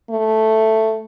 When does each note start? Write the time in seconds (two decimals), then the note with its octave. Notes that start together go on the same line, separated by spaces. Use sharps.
0.10 A3